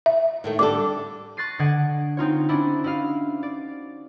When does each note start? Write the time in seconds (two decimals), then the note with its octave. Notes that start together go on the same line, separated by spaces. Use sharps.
0.06 E5
0.44 A2 D#3 A3
0.59 D3 G3 A4 D6
1.37 C#6 F#6 A6 A#6 C7 D#7
1.59 D3 D#5 F#5 G#6 D7
2.17 C4 D#4 F4 C#5
2.49 C#4 D4 E4
2.84 E4 F#4 D#5 F5
3.43 D5